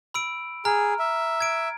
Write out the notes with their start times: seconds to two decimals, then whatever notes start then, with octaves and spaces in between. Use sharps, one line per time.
0.14 B5 E6 D7
0.65 G#4 A#5 F6
0.99 E5
1.40 G#6 D7